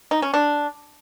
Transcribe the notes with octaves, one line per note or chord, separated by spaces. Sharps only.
D#4
C#4
D4